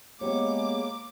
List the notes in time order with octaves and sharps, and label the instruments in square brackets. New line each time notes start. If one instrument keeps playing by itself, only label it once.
[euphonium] G#3 [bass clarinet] A#3 [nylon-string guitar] B3 G4 C#5 [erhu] D6